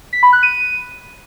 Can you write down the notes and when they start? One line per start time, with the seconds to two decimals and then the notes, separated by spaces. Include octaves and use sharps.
0.13 B6
0.23 B5
0.33 F#6
0.43 D#7